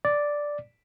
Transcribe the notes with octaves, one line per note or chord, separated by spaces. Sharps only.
D5